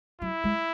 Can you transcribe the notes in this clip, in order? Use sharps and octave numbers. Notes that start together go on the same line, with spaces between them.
F#3 E4
G#3